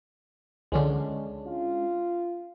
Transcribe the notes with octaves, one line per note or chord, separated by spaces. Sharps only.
C#2 D3 G#3 C#4 D4
F4